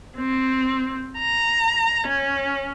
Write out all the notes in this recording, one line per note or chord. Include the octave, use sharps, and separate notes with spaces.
C4
A#5
C#4